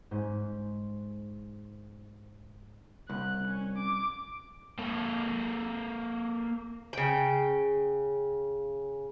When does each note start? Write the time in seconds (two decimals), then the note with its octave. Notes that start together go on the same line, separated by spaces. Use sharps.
0.11 G#2 C#4 C5
3.09 C2 F#6
3.47 C#4
3.78 D6
4.78 A#3 A4
6.93 C#3 G5